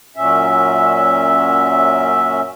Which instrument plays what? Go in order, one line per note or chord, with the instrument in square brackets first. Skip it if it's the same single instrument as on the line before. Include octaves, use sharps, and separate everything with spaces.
[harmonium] F#2 A#2 C#4 E5